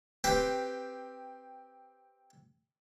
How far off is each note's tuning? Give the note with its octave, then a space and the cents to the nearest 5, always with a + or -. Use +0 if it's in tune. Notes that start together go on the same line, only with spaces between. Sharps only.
C4 +5 G4 +0 B4 +15